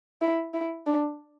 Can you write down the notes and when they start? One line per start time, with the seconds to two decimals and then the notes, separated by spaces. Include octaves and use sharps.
0.22 E4
0.54 E4
0.86 D4